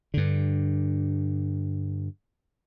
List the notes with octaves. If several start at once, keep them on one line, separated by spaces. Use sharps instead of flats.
G2 D3